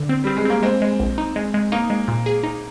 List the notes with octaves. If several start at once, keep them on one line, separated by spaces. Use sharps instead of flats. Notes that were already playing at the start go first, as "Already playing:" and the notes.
Already playing: D3
C4
G3 C4
G#3
A#3 C4
G#3 C4
G#3
A#1
D#4
G#3
G#3
A#3 D#4
G#3
A#2
G#4
D#4